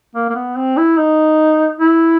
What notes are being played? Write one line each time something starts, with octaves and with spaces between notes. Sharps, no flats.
A#3
A#3
B3
C4
E4
D#4
E4